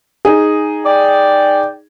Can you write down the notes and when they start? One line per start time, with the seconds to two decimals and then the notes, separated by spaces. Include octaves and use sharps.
0.25 D#4 G#4
0.86 D5 G5